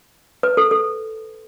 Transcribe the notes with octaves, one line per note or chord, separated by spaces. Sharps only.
B4
A4
A4